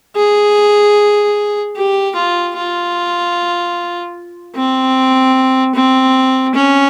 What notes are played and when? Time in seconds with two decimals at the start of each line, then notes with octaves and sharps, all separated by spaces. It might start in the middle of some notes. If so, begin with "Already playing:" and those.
0.16 G#4
1.76 G4
2.16 F4
2.56 F4
4.55 C4
5.75 C4
6.55 C#4